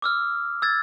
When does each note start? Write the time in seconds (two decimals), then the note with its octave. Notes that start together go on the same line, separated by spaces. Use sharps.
0.02 D6 E6 F6
0.62 E6 G#6 A6